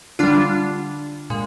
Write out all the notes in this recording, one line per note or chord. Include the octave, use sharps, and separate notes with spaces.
D3 G3 D4 F4
A#2 G#3